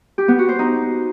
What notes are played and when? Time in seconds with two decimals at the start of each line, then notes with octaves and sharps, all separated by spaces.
0.18 G4
0.28 B3
0.38 F#4
0.49 C5
0.59 D#4